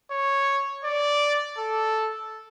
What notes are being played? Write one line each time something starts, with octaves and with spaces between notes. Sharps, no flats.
C#5
D5
A4